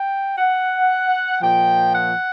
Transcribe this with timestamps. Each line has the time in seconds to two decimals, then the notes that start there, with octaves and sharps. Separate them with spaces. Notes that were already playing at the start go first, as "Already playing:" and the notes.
Already playing: G5
0.38 F#5
1.42 A#2 F3 G5
1.93 F#5